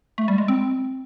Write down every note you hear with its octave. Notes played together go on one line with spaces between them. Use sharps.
A3
G3
G#3
C4